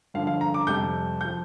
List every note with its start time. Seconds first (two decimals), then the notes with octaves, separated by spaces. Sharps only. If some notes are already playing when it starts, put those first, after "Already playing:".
0.14 G2 D3 F3 F5
0.27 F5
0.41 A#5
0.54 D6
0.67 F2 C3 G3 G6
1.21 F3 G6